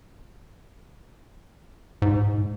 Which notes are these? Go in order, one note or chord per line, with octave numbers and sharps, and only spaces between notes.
G#2